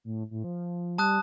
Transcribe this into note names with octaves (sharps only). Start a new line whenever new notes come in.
A2
A2
F3
G3 A5 D#6 F#6